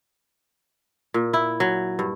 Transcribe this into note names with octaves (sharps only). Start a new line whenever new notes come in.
A#2
E4
F#3
G2